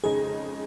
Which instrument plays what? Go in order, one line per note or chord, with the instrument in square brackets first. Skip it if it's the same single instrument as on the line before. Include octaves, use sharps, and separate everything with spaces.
[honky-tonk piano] F2 C#3 G#3 D#4 [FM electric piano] G#4